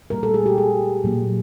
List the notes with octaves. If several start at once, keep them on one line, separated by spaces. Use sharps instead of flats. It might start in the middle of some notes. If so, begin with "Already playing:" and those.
A#2 G3 A#3 A#4
A4
G#4
G4
G#4
A#2 F#3 A#3